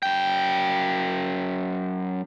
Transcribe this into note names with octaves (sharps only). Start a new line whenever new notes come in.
F#2 G5